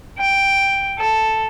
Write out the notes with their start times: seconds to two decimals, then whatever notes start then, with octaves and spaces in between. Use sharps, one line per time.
0.18 G5
0.97 A4